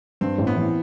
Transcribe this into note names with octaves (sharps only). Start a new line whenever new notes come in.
G2 C4
A1
B3
E3